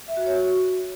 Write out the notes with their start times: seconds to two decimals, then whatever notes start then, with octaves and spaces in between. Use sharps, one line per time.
0.08 E5
0.17 F#4
0.26 C#5
0.35 F#4